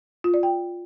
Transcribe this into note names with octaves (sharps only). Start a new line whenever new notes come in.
F4
D5
G5